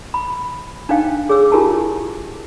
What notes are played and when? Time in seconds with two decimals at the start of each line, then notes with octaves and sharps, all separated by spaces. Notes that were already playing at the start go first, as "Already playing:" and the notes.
0.14 B5
0.89 D4 D#4 C5 F5 G5
1.29 G#4 C#5 D6 E6
1.52 E4 F4 G4 A#4 G#5 A5